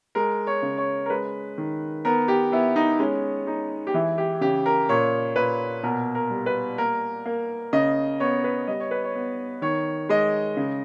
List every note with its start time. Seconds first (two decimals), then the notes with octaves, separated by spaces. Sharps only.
0.15 G#3 A#4
0.47 C#5
0.62 C#3
0.78 C#5
1.06 A#4
1.10 G#3 B4
1.58 D#3
2.05 B3 A#4
2.28 G4
2.52 B3 E4
2.76 D#4
2.99 G#3 C#4
3.47 G#3 D#4
3.87 G4
3.94 E3 E4
4.18 G4
4.41 C#3 G4
4.66 A#4
4.89 A#2 C#5
5.36 A#2 B4
5.83 B2 A#4
6.15 A#4
6.31 G3
6.46 B4
6.78 A#3 A#4
7.26 A#3
7.73 C#3 D#5
8.20 B3 C#5
8.44 B4
8.67 G3 D#5
8.80 C#5
8.91 B4
9.04 C#5
9.15 B3
9.62 D#3 C#5
10.09 G#3 D#5
10.57 C#3